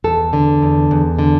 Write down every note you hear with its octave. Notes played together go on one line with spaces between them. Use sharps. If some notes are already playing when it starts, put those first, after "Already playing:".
E2 A4
D3
E2
E2
D3